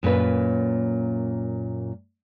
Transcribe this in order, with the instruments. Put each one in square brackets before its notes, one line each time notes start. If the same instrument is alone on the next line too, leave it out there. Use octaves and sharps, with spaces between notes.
[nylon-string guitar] F#2 A#2 C#4 B4